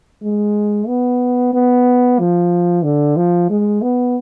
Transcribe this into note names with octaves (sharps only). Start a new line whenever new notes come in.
G#3
B3
B3
F3
D3
F3
G#3
B3